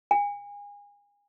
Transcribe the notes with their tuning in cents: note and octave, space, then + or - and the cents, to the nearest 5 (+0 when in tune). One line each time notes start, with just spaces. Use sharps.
G#5 -30